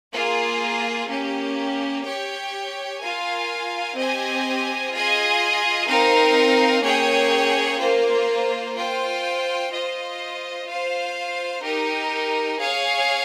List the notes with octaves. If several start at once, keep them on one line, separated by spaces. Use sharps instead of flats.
A#3 F4 G#4
A#3 C#4 G4
G4 C#5 G5
F4 A#4 F5 G#5
C4 G4 C5 D#5 G#5
F4 G#4 D#5 G#5
C4 D#4 A#4 F5
A#3 C#4 G#4 C#5 G5
A#3 F4 C5
F4 C5 G5
F4 C5 D#5
F4 C5 F5
D#4 G4 A#4
G#4 C#5 F5